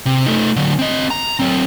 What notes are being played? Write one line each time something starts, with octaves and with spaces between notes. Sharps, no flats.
C3
A3 D#4
D3 F#3
C4 D#5
A#5
F#3 C4